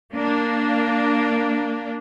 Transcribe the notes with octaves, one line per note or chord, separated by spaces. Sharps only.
A#3 D4